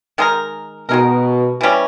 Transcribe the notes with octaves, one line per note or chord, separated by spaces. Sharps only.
D#3 G#3 D#4 A#4
B2 D#3 G#3 D#4 A#4
E3 G3 C#4